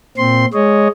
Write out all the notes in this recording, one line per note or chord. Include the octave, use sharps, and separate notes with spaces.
A#2 C4 C6
G#3 C#5 D#5